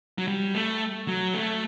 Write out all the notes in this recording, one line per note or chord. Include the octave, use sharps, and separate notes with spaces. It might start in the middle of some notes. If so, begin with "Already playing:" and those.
F#3
G3
A3
F#3
A3